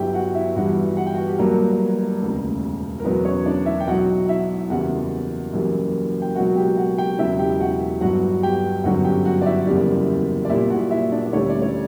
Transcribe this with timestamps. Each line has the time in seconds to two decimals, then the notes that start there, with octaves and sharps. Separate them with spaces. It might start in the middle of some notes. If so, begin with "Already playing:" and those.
Already playing: G1 G2 F#3 E4 G4 E5 G5
0.14 F#4 F#5
0.35 E4 E5
0.56 G1 G2 E3 G3 F#4 F#5
0.97 F#5
1.06 G5
1.15 F#4 F#5
1.27 G4
1.38 G1 G2 F#3 A#3 A#4
2.21 E1 D2 C#3
3.00 A#4
3.04 E1 E2 B2 F#3 B3 B4
3.25 C#4 C#5
3.46 D4 D5
3.66 E4 E5
3.80 G5
3.87 B1 B2 F#3 F#4 F#5
4.28 E4 E5
4.69 F#1 E2 C#3 E3 G3 F#4 F#5
5.53 F#1 F#2 E3 G3
6.22 G5
6.35 C#2 B2 F#3 F#4 F#5
6.56 G4 G5
6.77 F#4 F#5
6.98 G4 G5
7.18 E1 E2 C#3 F#3 E4 E5
7.39 G4 G5
7.60 F#4 F#5
8.01 G1 G2 F#3 F#4 F#5
8.43 G4 G5
8.84 G1 F#2 D3 F#3 F#4 F#5
9.05 G4 G5
9.25 F#4 F#5
9.42 D5
9.46 E4 E5
9.67 F#1 E2 C#3 G3
10.45 D5
10.50 A#1 A#2 G3 E4 E5
10.70 F#4 F#5
10.91 E4 E5
11.12 D4 D5
11.26 D5
11.32 D2 D3 G3 C#4 C#5
11.49 D5
11.62 C#5